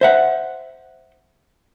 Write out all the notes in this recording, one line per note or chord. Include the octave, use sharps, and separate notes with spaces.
C5 E5 F#5